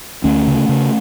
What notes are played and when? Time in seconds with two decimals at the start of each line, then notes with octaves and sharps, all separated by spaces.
0.24 D2 A3 C#4
0.47 C#3
0.69 C#3